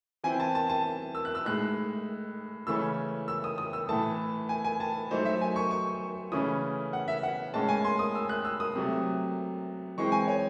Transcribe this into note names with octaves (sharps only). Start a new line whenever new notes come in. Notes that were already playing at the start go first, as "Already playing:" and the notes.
E3 C4 E4 G#5
A5
A5
A5
E6
F#6
E6
A2 G#3 D#4 F#6
C#3 E3 A3 C#4 E6
E6
D#6
D#6
E6
A2 E3 A3 A5
G#5
G#5
A5
F#3 A3 D#4 C5
E5
G#5
C#6
C#6
C#3 E3 A3 C#4 E4 D#6
F#5
E5
F#5
A2 G#3 C#4 A5
G#5
C6
D#6
E6
F#6
E6
D#6
C3 F#3 A3
E3 G#3 C4 E4 C#6
G#5
C#5